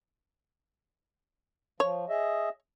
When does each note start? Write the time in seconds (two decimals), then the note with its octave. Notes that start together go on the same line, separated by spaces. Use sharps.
1.80 F3 C#5
2.09 G#4 D#5 E5